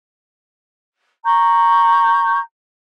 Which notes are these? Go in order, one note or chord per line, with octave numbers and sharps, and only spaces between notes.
A#5 C#6 G6